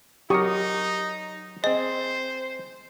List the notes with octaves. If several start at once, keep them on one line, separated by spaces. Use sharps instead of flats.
F#3 D#4 G4 A#4 C#6 D#6
C4 G#4 C5 D#5